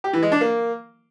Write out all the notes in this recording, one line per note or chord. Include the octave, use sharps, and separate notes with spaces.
G4
E3
G#3
D4
A#3